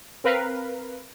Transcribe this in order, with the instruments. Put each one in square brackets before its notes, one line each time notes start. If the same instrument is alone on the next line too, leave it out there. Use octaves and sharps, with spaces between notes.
[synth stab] C4 A#4 B4 F5